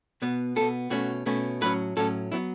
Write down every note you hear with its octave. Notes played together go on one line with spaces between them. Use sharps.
B2 B3
B2 B3 A4
B2 A3 C#4 F#4
B2 A3 C#4
A2 F#3 C#4 B4
A2 F#3 C#4 A4
F#3 B3 E4